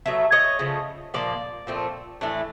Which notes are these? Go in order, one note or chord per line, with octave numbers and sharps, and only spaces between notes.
B2 F#3 A3 E5
C#5 D#5
C#3 F3 A3
A#2 F3 A#3 D5
A#2 F3 A3 C4
A2 E3 A3 D4